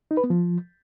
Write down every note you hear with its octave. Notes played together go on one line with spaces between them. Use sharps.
D#4
B4
B3
F3